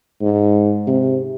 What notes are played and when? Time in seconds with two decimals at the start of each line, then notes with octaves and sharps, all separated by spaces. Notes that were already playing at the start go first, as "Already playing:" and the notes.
0.22 G#2
0.87 C3